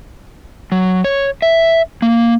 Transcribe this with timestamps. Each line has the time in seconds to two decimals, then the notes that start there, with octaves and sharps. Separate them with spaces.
0.72 F#3
1.04 C#5
1.42 E5
2.02 A#3